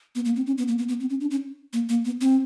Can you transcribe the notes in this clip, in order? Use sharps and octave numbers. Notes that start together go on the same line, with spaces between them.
B3
A#3
C4
C#4
B3
A#3
B3
B3
C4
C#4
D4
C#4
A#3
A#3
B3
C4